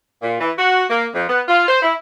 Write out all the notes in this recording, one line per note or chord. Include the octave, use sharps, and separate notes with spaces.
A#2
E3
F#4
A#3
F2
B3
F4
C5
E4